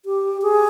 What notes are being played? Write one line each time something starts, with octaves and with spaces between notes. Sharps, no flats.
G4
G#4